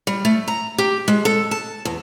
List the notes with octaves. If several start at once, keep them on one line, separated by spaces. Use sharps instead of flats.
G3
A3
A#5
G4
G#3
A4
A5
E2